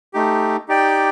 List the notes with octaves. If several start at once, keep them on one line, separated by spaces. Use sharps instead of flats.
A3 D#4 G4
D#4 G4 D5 G5